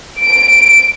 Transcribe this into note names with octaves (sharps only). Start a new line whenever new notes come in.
D7